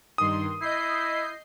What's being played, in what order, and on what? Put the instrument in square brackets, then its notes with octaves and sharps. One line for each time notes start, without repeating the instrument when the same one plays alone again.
[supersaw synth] G2 D#3 C6 [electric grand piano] D#6
[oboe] E4 [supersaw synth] D#5 G6 C7